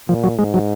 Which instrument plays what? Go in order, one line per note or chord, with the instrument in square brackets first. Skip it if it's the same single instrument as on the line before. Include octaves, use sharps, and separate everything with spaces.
[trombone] A#2 [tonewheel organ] F3
[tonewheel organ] F#3
[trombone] G#2 [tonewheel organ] G#3
[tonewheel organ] F#3